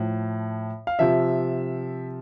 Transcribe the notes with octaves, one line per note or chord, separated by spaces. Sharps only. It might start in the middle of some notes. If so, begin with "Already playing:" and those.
Already playing: A2 F3
F5
C3 F3 E5